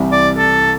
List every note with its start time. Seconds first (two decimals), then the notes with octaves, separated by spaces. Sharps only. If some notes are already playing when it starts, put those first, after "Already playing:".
Already playing: C2 C3 E3 G3
0.12 D5
0.37 A4